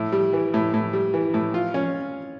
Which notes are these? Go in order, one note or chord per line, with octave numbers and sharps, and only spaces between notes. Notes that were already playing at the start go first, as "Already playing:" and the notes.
Already playing: A2
G3
E3
A2
A2
G3
E3
A2
F4
C#4